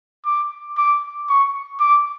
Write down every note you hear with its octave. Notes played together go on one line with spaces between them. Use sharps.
D6
D6
C#6
D6